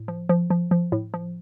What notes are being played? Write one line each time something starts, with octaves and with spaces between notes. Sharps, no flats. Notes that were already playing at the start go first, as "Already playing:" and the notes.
Already playing: A2
F3
F3
F3
F3
A2
F3